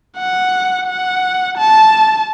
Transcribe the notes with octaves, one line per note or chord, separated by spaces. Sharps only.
F#5
F#5
A5